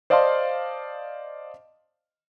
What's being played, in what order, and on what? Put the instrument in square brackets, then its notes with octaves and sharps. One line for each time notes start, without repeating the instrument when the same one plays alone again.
[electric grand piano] C5 D5 D#5 F5 A5 C6